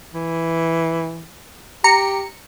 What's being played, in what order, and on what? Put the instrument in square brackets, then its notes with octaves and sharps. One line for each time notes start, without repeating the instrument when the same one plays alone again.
[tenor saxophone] E3
[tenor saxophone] G4 [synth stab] A#5 C#7